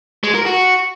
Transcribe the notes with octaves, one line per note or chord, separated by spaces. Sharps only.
G#3
A#4
F#4